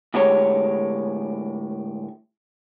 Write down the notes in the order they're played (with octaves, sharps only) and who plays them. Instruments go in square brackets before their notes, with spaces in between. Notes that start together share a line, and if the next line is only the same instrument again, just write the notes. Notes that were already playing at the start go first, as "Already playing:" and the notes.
[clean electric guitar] A2 D3 G#3 G4 C#5